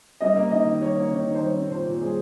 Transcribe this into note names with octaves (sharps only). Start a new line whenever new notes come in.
G3 D#5
A#3
D#3 D#5
D#3
G3 C#5
A#3
D#3 C#5
D#3
C5
G3 C#5
C4
A#2 C5
A#2
G3 G#4